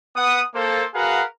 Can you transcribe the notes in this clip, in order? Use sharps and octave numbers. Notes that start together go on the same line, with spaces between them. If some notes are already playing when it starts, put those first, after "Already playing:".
B3 F#5 D#6
A#3 A4 C5
F#4 G#4 A#4 B4 F5 F#5